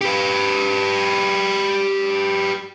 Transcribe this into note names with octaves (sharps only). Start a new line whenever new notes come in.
G4 B4